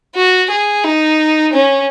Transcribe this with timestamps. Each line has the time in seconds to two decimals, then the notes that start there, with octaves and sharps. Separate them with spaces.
0.15 F#4
0.50 G#4
0.84 D#4
1.53 C#4